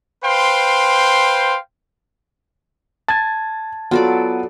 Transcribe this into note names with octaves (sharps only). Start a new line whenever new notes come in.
B4 C5 F5 G5 C6
A5 G#6 A6
F#3 B3 F4 A4 D5